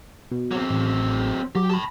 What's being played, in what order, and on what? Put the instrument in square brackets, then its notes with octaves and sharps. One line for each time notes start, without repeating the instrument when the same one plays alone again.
[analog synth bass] B2
[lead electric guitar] F#3 C4
[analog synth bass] A1
[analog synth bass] F#3 [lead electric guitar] G4
[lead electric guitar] A5 B5